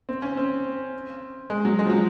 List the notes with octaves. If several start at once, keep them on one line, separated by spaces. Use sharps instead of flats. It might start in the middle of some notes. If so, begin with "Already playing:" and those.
C4
C#4
C4
G#3
F#3
G#3
F3
F#3